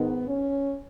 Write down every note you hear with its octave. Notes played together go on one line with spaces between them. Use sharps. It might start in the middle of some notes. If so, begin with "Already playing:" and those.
Already playing: G#2 D#3 B3
C#4